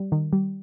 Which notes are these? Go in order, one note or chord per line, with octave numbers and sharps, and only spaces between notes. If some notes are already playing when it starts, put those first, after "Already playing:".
Already playing: G3
D#3
G3